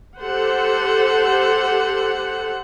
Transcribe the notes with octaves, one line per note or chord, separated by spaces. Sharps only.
G4 A4 C5 F#5